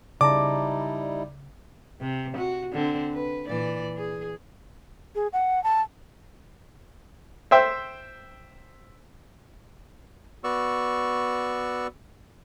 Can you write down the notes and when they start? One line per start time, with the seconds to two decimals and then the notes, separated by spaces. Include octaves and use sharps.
0.21 C#3 G3 D#4 E4 D5 A5 A#5 D6
2.01 C3
2.37 F#4
2.73 D3 C4
3.13 B4
3.46 A#2 E3 D5
3.96 G#4
5.15 G#4
5.33 F#5
5.64 A5
7.51 C5 E5 G5 E6
10.44 B3 F#4 D5 C#6 E6